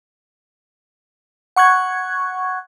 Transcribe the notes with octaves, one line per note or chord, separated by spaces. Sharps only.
F#5 C#6 F#6 G#6